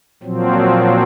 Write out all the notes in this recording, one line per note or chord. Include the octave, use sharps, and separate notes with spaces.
A#2 F3 F#3 C4